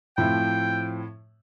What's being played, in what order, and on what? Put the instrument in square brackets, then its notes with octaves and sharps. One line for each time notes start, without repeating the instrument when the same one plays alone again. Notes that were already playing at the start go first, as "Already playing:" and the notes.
[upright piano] A2 F3 C4 E4 [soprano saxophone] G5